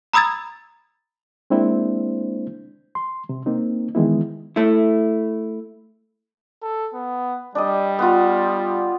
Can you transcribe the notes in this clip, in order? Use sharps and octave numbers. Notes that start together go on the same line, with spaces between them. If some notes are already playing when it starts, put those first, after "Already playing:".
A#5 B5 D#6 E6 G#6 A6
G#3 A#3 C4 D4 E4 C5
C6
C3
A#3 C4 D#4
D#3 E3 G#3 B3 E4
A3 E4
A4
B3
G3 D4 D#5
B3 F4